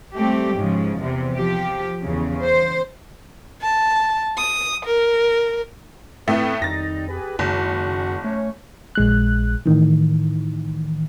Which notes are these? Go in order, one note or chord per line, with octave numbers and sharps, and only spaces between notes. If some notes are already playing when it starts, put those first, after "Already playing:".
G3 A3 C4 G4
G#2 C#3 F3
E2 C3
F3 G4
E2 C#3
C5
A5
D#6
A#4
A2 A3 C4 E4 A4 B4
F2 D#3 G3 D#4 A6 A#6
G4 G#4 B4
F#1 F#2 D#3 G#3 F#4
A3 C#4 C#5
A#1 G#3 F#6
A2 D#3 E3